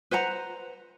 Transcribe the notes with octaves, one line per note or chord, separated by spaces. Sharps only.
B4 C5 F#5 A#5